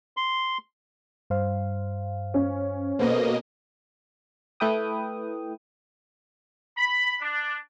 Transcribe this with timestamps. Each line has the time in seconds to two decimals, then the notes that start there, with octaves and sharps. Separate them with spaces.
0.17 C6
1.30 G2 C5 F5
2.34 C#4
2.99 B2 A#3 A4 B4 C5 D#5
4.60 A3 E4 B4 G5 D#6
6.77 B5
7.21 D4